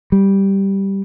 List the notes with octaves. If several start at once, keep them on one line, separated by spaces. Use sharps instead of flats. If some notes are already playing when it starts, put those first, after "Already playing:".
G3